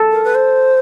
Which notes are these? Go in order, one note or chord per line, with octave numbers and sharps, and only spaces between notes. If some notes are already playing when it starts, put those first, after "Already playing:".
Already playing: A4
A#4
B4
C5